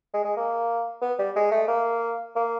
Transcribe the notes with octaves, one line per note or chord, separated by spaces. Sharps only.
G#3
G#3
A#3
B3
G3
G#3
A3
A#3
A#3